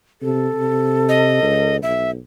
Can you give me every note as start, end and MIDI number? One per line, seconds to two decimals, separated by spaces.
0.22 0.49 48
0.22 1.76 69
0.55 1.39 48
1.09 1.77 75
1.43 1.81 37
1.83 2.17 35
1.83 2.10 76